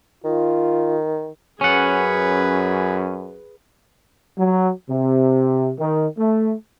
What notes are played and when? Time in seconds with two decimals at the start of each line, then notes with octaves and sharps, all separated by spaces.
0.24 D#3 F4
1.61 F#2 C#4 G#4 B4 F#5
4.39 F#3
4.90 C3
5.80 D#3
6.18 A3